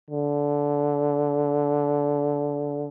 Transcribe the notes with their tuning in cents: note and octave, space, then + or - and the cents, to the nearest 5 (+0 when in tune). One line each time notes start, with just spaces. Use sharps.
D3 -20